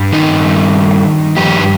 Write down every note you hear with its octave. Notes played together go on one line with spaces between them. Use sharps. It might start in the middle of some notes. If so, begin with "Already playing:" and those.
Already playing: G2 G3
D#3 D#4
G2 F3 G4